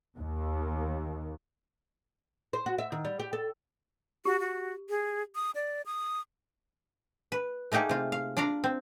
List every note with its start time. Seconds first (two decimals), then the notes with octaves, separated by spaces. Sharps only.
0.18 D#2
2.53 C5
2.66 F#4
2.78 E5
2.92 D#3
3.05 G3
3.19 G4
3.33 A4
4.25 F#4 G4
4.40 F#4
4.89 G#4
5.35 D#6
5.55 D5
5.86 D#6
7.32 B4
7.72 A3 A#3 D#4 G4 G#4
7.89 C3 F4
8.12 F5
8.37 D4 F4 D5 F5 A#5
8.64 C4